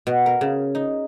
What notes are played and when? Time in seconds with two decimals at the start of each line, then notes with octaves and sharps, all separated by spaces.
0.07 B2
0.26 A#4
0.41 C#3
0.75 D#4